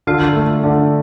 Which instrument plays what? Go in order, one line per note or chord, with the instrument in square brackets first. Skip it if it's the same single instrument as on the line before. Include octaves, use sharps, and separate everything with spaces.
[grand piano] D3 [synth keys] F4
[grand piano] A3
D3